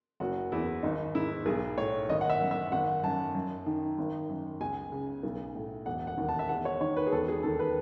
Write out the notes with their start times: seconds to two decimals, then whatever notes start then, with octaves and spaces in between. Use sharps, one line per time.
0.20 F#1 F#4
0.52 E2 E4
0.83 G#1 D#4
1.15 G#2 E4
1.46 B1 G#4
1.77 A2 C#5
2.09 G#1 D#5
2.21 F#5
2.30 E5
2.41 F#2
2.51 E5
2.72 G#1 F#5
3.03 F#2 A5
3.35 F#2
3.66 D#3
3.98 G#1
4.29 F#2
4.61 C#2 G#5
4.92 C#3
5.23 B1
5.55 A2
5.86 E1 F#5
6.07 F#5
6.18 D#2
6.29 A5
6.39 E5
6.49 E2 F#5
6.65 C#5
6.81 D#3 C#5
6.97 B4
7.07 G#4
7.12 E1 A4
7.28 G#4
7.43 D#2 A4
7.59 B4